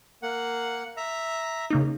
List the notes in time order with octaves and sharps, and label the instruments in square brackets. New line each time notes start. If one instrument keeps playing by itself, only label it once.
[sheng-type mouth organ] A#3 F#5
E5 A#5
[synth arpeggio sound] C#3 A#3 D#4